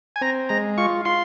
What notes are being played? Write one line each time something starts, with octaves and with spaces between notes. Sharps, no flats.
G#5
C4 A#5
G#3 A#5
F4 C#6
F4 C6